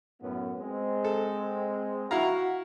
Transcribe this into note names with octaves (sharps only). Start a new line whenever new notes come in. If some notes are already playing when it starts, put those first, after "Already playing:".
F#2 A2 B3
G#3 C4
A4
E4 F#4 F5 A#5